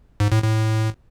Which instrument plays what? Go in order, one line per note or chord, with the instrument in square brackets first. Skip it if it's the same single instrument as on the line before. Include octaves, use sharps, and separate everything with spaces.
[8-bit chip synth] G#2
A2
A2